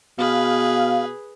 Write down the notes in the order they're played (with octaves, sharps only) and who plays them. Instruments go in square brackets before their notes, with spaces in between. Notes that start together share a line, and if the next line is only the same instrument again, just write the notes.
[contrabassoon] B2 [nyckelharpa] G#4 B4 [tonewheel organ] F5